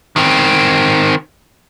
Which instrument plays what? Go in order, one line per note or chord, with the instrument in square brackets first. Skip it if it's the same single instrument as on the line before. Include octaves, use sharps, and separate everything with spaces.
[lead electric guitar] D#3 C4